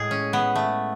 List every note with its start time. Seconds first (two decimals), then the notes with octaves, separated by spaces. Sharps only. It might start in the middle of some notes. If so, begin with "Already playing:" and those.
Already playing: A2 G#3 G#4
0.11 C#4
0.33 B3
0.56 A3